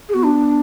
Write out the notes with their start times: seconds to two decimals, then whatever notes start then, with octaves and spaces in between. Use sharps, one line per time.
0.09 G#4
0.14 B3 F#4
0.25 D4